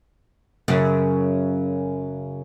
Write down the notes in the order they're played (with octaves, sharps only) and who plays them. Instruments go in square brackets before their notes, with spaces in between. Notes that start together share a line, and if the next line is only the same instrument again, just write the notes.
[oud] F#2 C#3